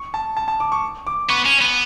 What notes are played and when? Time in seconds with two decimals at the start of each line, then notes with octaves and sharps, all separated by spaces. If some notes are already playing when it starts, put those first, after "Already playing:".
Already playing: C#6
0.14 A5
0.37 A5
0.48 A5
0.60 D6
0.72 C#6
1.07 D6
1.29 B3 C#6
1.45 C#4
1.61 B3